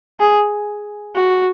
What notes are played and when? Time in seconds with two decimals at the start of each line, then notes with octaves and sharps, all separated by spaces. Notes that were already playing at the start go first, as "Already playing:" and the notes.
0.20 G#4
1.16 F#4